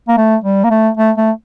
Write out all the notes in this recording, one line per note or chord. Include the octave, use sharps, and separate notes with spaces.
A#3
A3
G3
A#3
A3
A3
A3